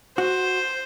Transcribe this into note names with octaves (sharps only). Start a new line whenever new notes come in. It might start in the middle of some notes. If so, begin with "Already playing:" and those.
F#4 C5